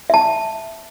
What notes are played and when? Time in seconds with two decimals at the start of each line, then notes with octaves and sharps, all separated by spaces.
0.10 E5 A5